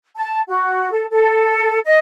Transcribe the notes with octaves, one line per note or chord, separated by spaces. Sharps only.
A5
F#4
A4
A4
D#5